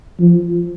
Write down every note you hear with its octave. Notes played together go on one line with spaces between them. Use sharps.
F3